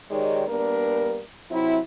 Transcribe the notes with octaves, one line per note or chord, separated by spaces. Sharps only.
D#3 G#3 D#4 G4 C#5 D5
G3 A#3 B3 D4 A#4
C3 F#3 C4 E4